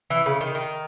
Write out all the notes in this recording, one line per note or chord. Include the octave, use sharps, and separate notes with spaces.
E3
C#3
D#3
D#3